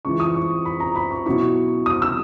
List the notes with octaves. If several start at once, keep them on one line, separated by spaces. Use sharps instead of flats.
C#2 C#3 E3 C#6
D#6
C#6
B5
A#5
B5
C#6
B2 F#3 C#4 E4 C#6
D#6
E6